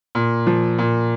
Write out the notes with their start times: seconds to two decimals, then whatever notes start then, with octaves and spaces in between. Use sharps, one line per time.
0.15 A#2
0.47 F3
0.79 A#2